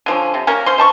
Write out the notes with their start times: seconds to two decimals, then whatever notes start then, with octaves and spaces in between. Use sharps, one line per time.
0.06 D3 F3 C#4
0.34 C3
0.47 A#3 C#4 A#4
0.66 C#4 C5 C6
0.78 C5 A5 C#6